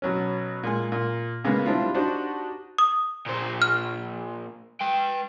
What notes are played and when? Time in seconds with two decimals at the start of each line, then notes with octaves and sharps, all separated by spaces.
0.02 B2 F#3 C#4
0.63 A#2 G#3 G#5
0.92 A#2
1.44 C#3 G#3 A#3 B3
1.66 G3 C4 D4 E4 F4
1.94 D4 D#4 F#4 G4 C5
2.78 D#6
3.26 A#2 C5
3.62 F6
4.81 B4 G5